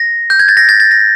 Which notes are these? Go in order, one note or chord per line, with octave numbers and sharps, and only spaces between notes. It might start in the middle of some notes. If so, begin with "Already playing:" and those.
Already playing: A#6
G6
G#6
A6
A#6
A6
A6
A#6